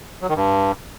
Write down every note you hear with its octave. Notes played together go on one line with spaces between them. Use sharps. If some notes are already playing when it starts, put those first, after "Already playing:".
F#3
D#3
G2